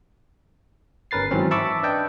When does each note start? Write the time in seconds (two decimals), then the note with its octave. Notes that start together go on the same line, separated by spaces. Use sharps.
1.11 G1 C#4 A#4 B4 A6 C7
1.31 G#2 D#3 E3 F#3 C4 C#4
1.51 E5 A5 B5 C#6 D6 E6
1.83 D4 B4 D#5 G5 A5